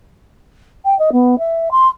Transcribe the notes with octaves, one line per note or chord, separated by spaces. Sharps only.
G5
D#5
B3
E5
C6